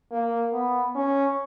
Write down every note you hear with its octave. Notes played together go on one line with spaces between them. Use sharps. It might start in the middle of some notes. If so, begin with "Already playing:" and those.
A#3
B3
C#4